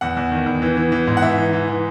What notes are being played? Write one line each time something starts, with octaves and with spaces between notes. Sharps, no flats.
E2 F#5
E2
D#3
E2
E3
E3
E3
G#2
F#5
E3 E5
E3
E3
E3